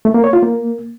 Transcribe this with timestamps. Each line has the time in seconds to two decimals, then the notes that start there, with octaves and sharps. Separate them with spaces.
0.05 A3
0.14 A#3
0.24 C#5
0.33 F4
0.43 A#3